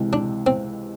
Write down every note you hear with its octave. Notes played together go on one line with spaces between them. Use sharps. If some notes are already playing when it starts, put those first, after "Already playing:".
Already playing: C#2 C3 E3 G#3
D4
C4